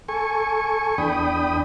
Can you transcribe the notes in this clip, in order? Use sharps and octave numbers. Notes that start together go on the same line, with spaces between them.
A4 G#5 C#6
E2 D4 G5 B5 D#6